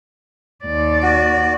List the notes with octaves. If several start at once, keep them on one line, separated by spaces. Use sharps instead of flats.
D#2 D5
F#4